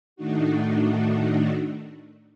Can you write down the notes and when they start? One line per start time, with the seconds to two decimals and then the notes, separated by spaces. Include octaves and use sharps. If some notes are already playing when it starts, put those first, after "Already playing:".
0.16 A2 D#3 A3 D4 D#4 F#4